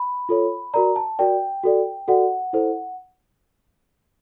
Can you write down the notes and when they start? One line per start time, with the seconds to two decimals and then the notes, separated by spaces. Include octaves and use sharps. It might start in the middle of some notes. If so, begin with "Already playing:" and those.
Already playing: B5
0.29 F4 A4 C#5
0.74 F#4 A#4 D5 A#5
0.96 A5
1.19 F#4 A#4 D5 G5
1.63 F#4 A4 D5
2.08 F#4 A4 D5 F#5
2.53 E4 A4 C5